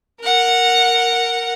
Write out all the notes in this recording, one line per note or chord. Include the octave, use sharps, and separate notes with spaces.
A#4 F#5